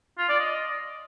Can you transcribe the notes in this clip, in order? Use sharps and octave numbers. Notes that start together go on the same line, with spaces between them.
F4
D5
D#5